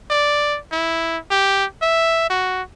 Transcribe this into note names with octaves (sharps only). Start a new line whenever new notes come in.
D5
E4
G4
E5
F#4